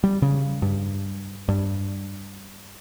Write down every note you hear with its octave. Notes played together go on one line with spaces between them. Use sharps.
G3
C#3
G2
G2